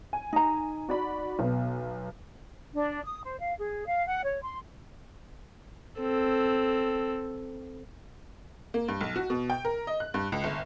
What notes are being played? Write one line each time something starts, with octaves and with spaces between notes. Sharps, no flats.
G#5
D#4 A#5
F#4 D5 B5
B1 B3
D4
D#6
C5
F5
G#4
F5
F#5
C#5
C6
C4 A4
A#3
G2
B1
F#4
B2
G5
A#4
D#5
F#6
G2
C#2
G1